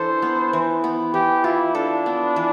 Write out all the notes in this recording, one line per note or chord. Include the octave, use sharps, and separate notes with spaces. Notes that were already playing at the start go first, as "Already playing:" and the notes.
Already playing: E3 D4 A4 C5
B3
E3
B3
E3 G4
E4 F4
D4 A4
B3
E3